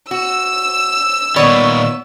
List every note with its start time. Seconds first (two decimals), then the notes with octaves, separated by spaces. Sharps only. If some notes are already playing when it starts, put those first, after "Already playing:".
0.11 F#4 E6
1.36 A#2 D#3 B3 C#5 D5 B5 C#6